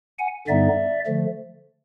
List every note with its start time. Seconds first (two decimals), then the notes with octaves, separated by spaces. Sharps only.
0.19 F#5 G#5
0.48 G2 D3 G3 B3 D#4 D5 E5
1.06 D3 F3 A3